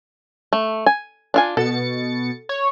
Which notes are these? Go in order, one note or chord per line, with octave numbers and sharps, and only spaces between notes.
A3
G#5
D4 F4 G#5
B2 A4 A6 C#7
C#5